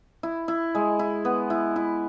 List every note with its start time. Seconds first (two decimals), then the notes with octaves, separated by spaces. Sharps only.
0.23 E4
0.48 E4
0.75 G#3
0.99 E4
1.25 B3
1.50 E4
1.76 E4